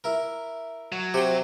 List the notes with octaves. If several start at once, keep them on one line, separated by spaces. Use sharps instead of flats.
E4 A#4
F#3
C3 G4 G5